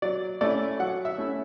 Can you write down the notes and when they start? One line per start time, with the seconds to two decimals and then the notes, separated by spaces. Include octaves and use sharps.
0.02 F#3 D5
0.41 A3 C#4 E4 D5
0.80 F#3 F#5
1.05 E5
1.18 A3 C#4 E4